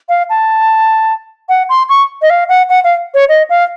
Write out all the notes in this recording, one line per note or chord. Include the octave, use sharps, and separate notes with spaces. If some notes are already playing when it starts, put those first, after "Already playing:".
F5
A5
F#5
C6
C#6
D#5
F5
F#5
F#5
F5
C#5
D#5
F5